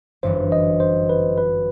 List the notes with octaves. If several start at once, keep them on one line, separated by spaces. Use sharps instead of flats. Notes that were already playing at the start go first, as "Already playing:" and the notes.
G1 F#2 E3 B3 C5
D#5
C5
B4
B4